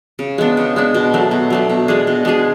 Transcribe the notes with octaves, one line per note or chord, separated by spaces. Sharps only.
C#3
G#3 B3 D4
C#3
G#3 B3 D4
B2
F#3 A3 D4
B2
F#3 A3 D4
B2
G#3 D4 G#4
B2
G#3 D4 G#4